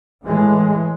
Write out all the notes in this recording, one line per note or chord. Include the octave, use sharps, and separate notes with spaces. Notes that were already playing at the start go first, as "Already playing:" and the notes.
A2 E3 G#3